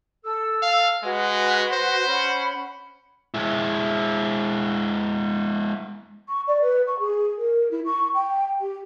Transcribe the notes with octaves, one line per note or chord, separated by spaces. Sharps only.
A4 E6
F5
G#3 F#4 B4
C5
C#4 F#5 B5
G#3 E4
C#6
D5
B4
C#6
G#4
A#4
E4
C#6
G5
G4